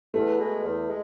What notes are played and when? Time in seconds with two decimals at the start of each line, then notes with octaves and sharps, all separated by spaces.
0.14 E2 A3
0.38 B2 G#3
0.63 E2
0.88 G#3